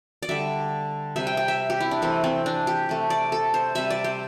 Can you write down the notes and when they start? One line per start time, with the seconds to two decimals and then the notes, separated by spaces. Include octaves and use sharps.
0.22 D5
0.29 D3 G3 E5
1.16 C3 G3 E5
1.27 G5
1.37 G5
1.48 E5
1.70 G4
1.80 E4
1.91 D4
2.02 C3 E3 A3 C4
2.24 C4
2.46 D4
2.67 G4
2.89 C3 A3
3.10 D5
3.32 A4
3.54 C5
3.75 C3 G3 E5
3.90 D5
4.04 C5